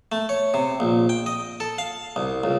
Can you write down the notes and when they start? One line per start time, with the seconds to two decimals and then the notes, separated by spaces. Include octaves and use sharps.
0.12 A3
0.29 C#5
0.54 C3
0.80 A#1
1.09 G5
1.26 D#5
1.60 A4
1.78 F5
2.16 C2
2.44 C#2